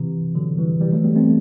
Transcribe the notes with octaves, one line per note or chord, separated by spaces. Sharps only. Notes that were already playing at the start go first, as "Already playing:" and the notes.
Already playing: C3 E3
D3 F#3
E3 G3
E3 G3
F#3 A3
G3 B3
A3 C4